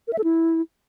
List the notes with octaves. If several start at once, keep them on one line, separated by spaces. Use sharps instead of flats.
A#4
E5
A4
E4